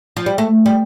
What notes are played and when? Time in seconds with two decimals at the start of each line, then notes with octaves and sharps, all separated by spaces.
0.17 F3
0.26 G3
0.38 A3
0.66 G3